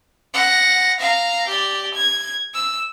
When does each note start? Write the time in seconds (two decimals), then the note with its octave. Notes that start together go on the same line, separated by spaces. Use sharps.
0.34 F#5 A#6
1.00 F5 A#5
1.47 G4 D5
1.94 G#6
2.54 E6